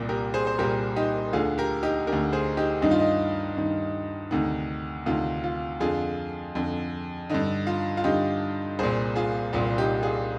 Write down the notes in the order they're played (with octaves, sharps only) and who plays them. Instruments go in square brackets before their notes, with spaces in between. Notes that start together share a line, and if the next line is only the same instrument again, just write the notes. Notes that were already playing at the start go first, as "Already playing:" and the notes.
Already playing: [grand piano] C2 A#2
G4 A#4
G#4 C5
C5
C2 A#2 G4 A#4
D#4 G4
D2 D3 F4 G#4
G4 A#4
D#4 G4
D3 G4 A#4
D2
G#4 C5
D#4 G4
G2 D#3 D#4
F4
D#4
G2 D#3
D2 C3 D#3
D2 C3 D#3 F4
F4
F2 D3 F4 G#4
F2 D3
G2 D3 D#4
F4
F4
G2 D3 D#4 G4
C2 A#2 G#4 C5
F4 G#4
C2 A#2 F4
D#4 G4
F4 G#4